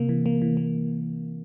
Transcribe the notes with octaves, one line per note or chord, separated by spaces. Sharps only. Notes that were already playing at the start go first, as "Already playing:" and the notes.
Already playing: C3 A#3
E3
A#3
E3
A#3